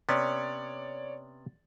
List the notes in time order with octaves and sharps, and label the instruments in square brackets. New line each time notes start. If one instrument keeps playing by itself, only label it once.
[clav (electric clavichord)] C3 B3 C#4 [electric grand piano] C#5 D5 A6